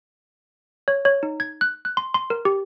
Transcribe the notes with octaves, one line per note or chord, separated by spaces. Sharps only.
C#5
C#5
D#4
G#6
F#6
F#6
C6
C6
A#4
G4